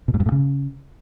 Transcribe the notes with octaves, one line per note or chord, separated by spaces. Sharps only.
B2
G#2
G2
A2
C#3